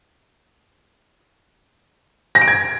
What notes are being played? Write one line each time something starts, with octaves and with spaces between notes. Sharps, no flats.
A#6
D7
G#6